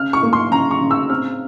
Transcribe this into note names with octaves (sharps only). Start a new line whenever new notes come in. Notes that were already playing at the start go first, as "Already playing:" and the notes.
Already playing: C#3 F6
C#6
A#3
C6
C#3 A#5
C#6
C#3
E6
C4 F6